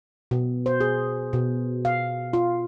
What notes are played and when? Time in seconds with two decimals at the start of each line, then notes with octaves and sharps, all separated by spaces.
0.31 B2
0.66 C5
0.81 G#4
1.33 B2
1.85 F5
2.33 F4